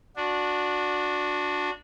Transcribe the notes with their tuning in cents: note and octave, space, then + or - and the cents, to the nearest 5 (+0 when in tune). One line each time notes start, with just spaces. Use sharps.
D4 +0 F#4 -25